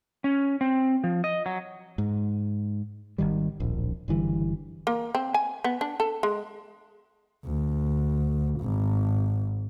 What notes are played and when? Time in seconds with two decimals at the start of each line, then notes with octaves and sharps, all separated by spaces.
0.24 C#4
0.61 C4
1.04 F3
1.24 D#5
1.46 F#3
1.98 G#2
3.18 G#1 D#2 D#3 G3
3.60 D1 A#1
4.08 F#1 D3 E3 G3
4.87 A#3
5.15 C4
5.34 G#5
5.64 B3
5.81 D4
6.00 A4
6.23 G#3
7.46 D2
8.60 G#1